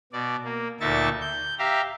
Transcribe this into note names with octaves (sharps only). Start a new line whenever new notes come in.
B2 D5
A#3
D2 A#2 D#4 E5 C#6 A6
G6
G4 E5 F5 A#5